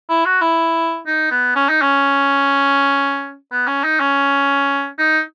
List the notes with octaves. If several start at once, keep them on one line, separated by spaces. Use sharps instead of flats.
E4
F#4
E4
D#4
B3
C#4
D#4
C#4
B3
C#4
D#4
C#4
D#4